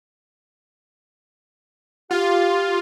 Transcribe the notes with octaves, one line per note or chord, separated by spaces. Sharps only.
F4 G4 F5